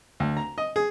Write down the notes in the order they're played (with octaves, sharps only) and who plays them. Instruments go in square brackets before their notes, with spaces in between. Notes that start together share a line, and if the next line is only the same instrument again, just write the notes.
[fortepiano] D2
A#5
D#5
G#4